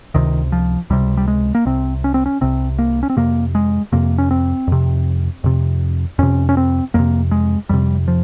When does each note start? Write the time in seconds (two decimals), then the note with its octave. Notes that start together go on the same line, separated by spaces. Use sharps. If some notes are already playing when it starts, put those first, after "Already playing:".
0.15 C#2 C3 D#3
0.52 F3
0.90 C#2 C3 G3
1.17 G3
1.28 G#3
1.55 A#3
1.65 C2 C3 C4
2.04 C#4
2.14 C4
2.26 C#4
2.41 C2 C3 C4
2.79 A#3
3.03 C#4
3.10 C4
3.17 F2 C3 A#3
3.55 G#3
3.92 F2 C3 A#3
4.18 C#4
4.31 C4
4.67 F2 C3
5.44 F2 C3
6.19 F2 C3 C#4
6.49 C#4
6.57 C4
6.94 F2 C3 A#3
7.31 G#3
7.69 F2 C3 G3
8.08 F3